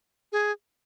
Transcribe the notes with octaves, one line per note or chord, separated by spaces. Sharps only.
G#4